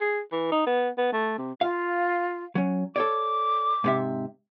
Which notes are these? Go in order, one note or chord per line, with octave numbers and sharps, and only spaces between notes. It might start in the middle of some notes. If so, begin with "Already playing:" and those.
G#4
E3
D#4
B3
B3
A3
C3
F4 F5
F#3 C#4
A4 C#5 D5 D6
G#2 C3 E5